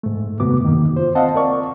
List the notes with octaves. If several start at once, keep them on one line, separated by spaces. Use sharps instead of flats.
G#2 A3
E2 G2 C3 B3 F#4 D6
F#2 D#3 A#3
F4 C5
C4 D#5 F5 F#5 A5
A#4 D5 C#6